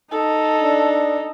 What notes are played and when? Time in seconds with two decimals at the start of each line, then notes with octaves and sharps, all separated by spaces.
0.12 D#4 A4
0.60 D4